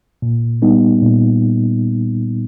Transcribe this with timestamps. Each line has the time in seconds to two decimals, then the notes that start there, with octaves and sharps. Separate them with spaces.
0.22 A#2
0.62 G3 B3 D#4
1.02 A#2